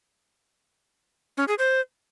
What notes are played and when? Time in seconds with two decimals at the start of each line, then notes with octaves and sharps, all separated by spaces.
1.37 C#4
1.48 G#4
1.59 C5